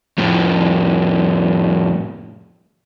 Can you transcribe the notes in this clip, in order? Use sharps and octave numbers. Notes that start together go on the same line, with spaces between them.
F2 A2